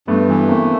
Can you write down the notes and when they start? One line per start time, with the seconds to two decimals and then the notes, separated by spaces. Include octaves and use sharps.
0.08 G2 A3 B3
0.28 E3
0.48 A3 A#3 C4